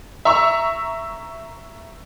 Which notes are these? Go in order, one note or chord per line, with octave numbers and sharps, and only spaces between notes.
E5 A#5 C#6 E6